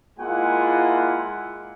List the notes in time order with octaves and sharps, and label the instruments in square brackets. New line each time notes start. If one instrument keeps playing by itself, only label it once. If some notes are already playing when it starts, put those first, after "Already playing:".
[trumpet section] G#3 A#3 E4 F4 F#5 G#5